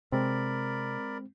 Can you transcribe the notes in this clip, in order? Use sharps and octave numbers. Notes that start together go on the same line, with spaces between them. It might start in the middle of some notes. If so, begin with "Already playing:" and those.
C3 G#3 C4 A#4 D5 B5